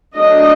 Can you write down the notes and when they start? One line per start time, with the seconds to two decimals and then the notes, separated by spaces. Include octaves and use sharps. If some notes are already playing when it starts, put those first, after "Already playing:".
0.15 F#3 A3 D4 D#5